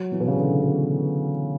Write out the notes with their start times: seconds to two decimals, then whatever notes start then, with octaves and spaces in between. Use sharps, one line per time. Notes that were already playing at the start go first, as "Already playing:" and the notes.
Already playing: F#3
0.12 E3
0.20 B2
0.28 C#3
0.36 D3
0.61 B2